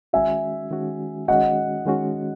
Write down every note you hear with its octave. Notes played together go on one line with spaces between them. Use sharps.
D#3 G#3 C#4 F#4 E5 G#5
D#3 G#3 C#4 F#4
D#3 G#3 C#4 F#4 D#5 F#5
D#3 G#3 C#4 F#4